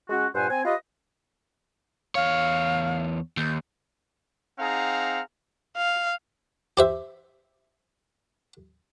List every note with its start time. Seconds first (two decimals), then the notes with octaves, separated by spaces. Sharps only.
0.10 G#3 C#4 F#4
0.35 G2 A#2 C5 F#5 G#5
0.50 C4 G#5
0.65 F4 G4 B4 D#5
2.15 E2 C#5 F5
3.37 D#2 G6
4.59 C4 D#4 G#4 F5 F#5 A#5
5.77 F5
6.77 G4 C5 E5